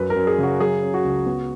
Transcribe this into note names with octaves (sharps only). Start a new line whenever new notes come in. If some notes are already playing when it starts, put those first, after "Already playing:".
Already playing: F#2 B4
A#4
F#2
G#4
C#3
F#4
F#3 G#4
C#4
F#4
C#2
B3